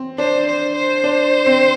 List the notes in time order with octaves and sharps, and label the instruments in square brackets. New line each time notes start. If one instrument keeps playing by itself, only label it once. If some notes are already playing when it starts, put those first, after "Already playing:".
Already playing: [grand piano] C4
[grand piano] D4 [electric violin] C5
[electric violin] C5
C5
[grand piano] D4
C4